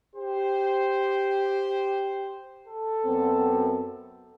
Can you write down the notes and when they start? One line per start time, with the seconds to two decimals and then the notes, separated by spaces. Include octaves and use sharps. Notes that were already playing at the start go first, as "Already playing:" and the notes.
0.16 G4 C5
2.68 A4
3.05 F#2 B3 C4